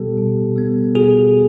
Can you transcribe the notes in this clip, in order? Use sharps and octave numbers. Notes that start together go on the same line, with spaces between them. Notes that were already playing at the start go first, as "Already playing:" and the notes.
Already playing: B2 G3 B3 G4 A4
B2
G3 B3
B2 F#4 G#4